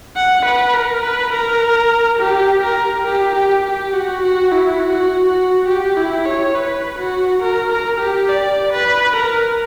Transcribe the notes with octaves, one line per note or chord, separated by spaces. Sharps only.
F#5
B4
A#4
B4
A#4
G4
A#4
G4
G4
G4
F#4
F#4
E4
F#4
F#4
G4
E4
C#5
B4
F#4
A#4
A#4
G4
D5
B4
A#4